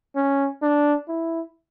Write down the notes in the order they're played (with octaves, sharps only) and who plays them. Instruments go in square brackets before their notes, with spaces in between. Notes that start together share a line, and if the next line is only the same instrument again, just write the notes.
[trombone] C#4
D4
E4